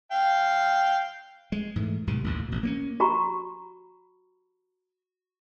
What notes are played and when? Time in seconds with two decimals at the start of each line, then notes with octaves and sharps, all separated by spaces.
0.12 F5 G5
1.52 G#3
1.76 G#2 E3 A3
2.07 B1 G#2 C3 D#3
2.24 A1 D#2 G#2
2.48 A1 B2
2.63 A#3 C4 C#4
3.00 F#4 G4 A#5 B5 C#6